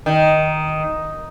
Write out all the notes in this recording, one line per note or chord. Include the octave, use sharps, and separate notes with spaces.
D#3